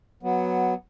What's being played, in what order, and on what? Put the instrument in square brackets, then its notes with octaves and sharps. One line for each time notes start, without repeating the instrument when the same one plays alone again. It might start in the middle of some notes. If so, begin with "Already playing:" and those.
[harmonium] F#3 B3